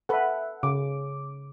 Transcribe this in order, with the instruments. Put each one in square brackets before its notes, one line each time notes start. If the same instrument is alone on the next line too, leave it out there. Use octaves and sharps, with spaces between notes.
[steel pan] A4 B4 [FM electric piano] E5 F#5
[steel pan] C#3 [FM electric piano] D6